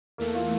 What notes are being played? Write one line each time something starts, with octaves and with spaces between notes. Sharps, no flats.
E2 E3 A3 A#3
F4